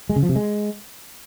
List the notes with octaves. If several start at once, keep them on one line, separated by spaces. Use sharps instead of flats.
G#3
C#3
F3
C3
G#3